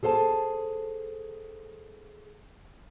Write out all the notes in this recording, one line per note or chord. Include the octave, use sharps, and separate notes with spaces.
G#4 A4 C5 F#5 A5